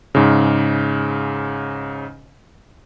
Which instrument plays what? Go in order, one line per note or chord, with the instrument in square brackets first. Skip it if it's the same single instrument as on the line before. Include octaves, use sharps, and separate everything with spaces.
[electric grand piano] G#2 C#3